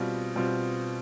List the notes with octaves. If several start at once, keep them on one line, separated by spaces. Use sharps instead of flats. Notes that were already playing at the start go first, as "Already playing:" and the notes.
Already playing: B2 G3 C4 F4
B2 G3 C4 F4